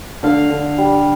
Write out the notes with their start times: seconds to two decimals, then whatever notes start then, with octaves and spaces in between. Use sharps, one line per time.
0.23 D3 F5
0.50 D3
0.78 G3